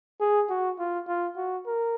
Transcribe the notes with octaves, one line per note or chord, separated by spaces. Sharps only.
G#4
F#4
F4
F4
F#4
A#4